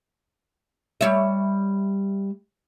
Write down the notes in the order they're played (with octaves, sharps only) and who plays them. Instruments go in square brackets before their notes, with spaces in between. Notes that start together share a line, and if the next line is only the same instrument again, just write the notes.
[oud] G3 C#5 E5